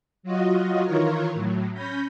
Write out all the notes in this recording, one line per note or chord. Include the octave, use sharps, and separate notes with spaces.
F#3 F4 F#4 D#5
D#3 E3 F4 A#4 C#5
A2 F#3
C#4 B5 G6 A#6